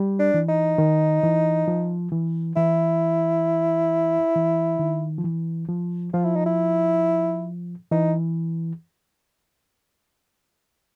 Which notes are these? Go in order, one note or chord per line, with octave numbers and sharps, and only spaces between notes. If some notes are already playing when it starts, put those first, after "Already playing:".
Already playing: G3
D4
E3
D#4
D#3
E3
F3
E3
E3 E4
E3
D#3
F3
E3
F3
F3 F4
E4
D#4
E4
E3 D#4